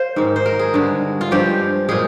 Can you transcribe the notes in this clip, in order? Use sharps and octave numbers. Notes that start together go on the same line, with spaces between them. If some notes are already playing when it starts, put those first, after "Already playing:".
Already playing: C5 F5
G#2 D#3 G#3
C5
A#4
G#4
G2 D3 G#3
F4
G2 F3 G#3 G4
A#2 F3 G#3 G#4